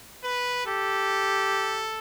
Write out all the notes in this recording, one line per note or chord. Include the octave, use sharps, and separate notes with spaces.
B4
G4 A4